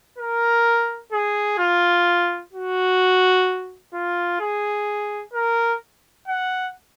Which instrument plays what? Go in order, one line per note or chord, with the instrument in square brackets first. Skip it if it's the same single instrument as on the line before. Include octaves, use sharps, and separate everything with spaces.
[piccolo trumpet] A#4
G#4
F4
F#4
F4
G#4
A#4
F#5